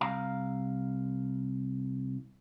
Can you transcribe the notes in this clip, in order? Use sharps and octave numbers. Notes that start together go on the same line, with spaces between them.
C2 F5 A#5